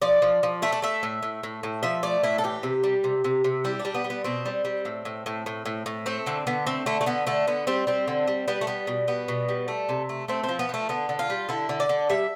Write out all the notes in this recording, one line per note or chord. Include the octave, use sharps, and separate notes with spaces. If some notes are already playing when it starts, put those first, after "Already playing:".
F3 D5
F3
F3
A3 E5
D5
A3 E5
A2
A2
A2
A2
F3 E5
A3 D5
A2 E4
A4
E3 G4
C3
G3
C3
C3
C3
G3 E4
D4
G3
B3
G3
B3
B2 C4
G3
G3
A2
A2
A2
A2
A2
A2
A3 C4
D3 C4
D3 B3
A3 C4
D3 A3
A3
D3 B3
D3 A3
D3 B3
G3 C4
G3 C4
D3
G3
G3 B3
A3
G3 B3
B2
G3 B3
B2
G3
A3
C3
A3
A3 C4
C4
F3
B3
F3 A3
D3 B3
D3
F4
G3
D3 E4
D3
D5
D3
G3 E5